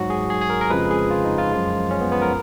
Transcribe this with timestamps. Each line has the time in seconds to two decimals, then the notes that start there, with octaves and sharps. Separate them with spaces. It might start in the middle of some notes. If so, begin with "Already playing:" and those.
Already playing: G#2 F#3 F#4
0.10 G#4
0.30 G#4
0.41 G#4
0.50 A#4
0.61 A#4
0.70 F2 C#3 F3 G#3 B4
0.91 G#4
1.11 F4
1.25 D#4
1.38 F4
1.52 F#2 F3 G#3
1.91 C#4
2.01 B3
2.12 B3
2.22 A#4